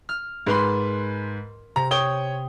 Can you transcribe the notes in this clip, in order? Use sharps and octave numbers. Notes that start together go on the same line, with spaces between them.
F6
G#2 A#4 B4 B5 C6
C3 A#5
C#5 G5 D#6 G7